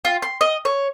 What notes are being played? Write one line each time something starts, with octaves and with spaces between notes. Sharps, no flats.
F4
C6
D#5
C#5